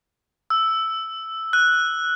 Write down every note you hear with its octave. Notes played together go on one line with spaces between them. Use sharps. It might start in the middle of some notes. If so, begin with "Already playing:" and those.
E6
F#6